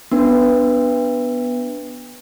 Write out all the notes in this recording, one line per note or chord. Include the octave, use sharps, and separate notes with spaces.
B3 D4 B4